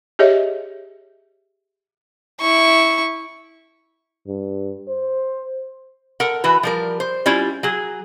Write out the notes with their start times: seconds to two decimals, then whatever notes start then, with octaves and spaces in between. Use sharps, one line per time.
0.19 G4 G#4 C#5 D#5 E5
2.41 E4 C#6
4.27 G2
4.88 C5
6.20 A4 A#4 F#5
6.44 E3 F#4 B4
6.63 F3 G3 A#4
7.00 C5
7.26 G3 C#4 E4 F4
7.63 F#3 G#4